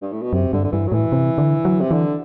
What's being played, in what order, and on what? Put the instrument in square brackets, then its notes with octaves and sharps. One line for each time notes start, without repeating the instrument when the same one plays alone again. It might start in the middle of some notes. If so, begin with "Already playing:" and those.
[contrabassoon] G2
A2
B2
[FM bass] F#2 [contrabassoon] C3
[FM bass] G2 [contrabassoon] D3
[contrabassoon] D3
[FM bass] G2 [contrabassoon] E3
[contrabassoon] F#3
[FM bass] A2 [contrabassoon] E3
[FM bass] C3
D3
F#3
[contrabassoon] C3
[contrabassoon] D3 [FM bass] E3